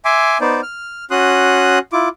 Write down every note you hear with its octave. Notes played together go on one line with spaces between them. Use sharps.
E5 G#5 C6 D6
B3 D#4 C5 D5
F6
C#4 F#4 C6 D#6 F#6
E4 F4 D6